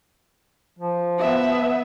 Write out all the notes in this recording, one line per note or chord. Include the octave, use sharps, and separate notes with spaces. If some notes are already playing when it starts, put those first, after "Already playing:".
F3
B3 E5